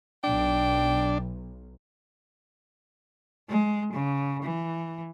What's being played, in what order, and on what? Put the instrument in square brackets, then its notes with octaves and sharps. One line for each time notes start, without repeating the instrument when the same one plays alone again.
[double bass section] B1 [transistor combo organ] D4 [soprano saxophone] G5
[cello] G#3
C#3
E3